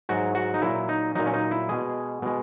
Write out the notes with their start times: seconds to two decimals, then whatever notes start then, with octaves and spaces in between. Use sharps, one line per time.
0.09 G#2 F#3 F#4
0.35 F#4
0.54 D#4
0.62 A#2 F#3 E4
0.89 D#4
1.15 A#2 F#3 D#4
1.26 C#4
1.34 D#4
1.51 E4
1.69 B2 G#3 G#4
2.22 B2 G#3